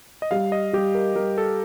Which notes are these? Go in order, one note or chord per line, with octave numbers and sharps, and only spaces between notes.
D#5
G3 F5
D#5
G3 G4
A#4
G3 A#4
A4